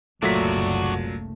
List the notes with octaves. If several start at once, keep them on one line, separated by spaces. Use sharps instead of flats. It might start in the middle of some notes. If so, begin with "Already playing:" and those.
F#1 C2 A#2 F#3 A3 D4 F#4 B6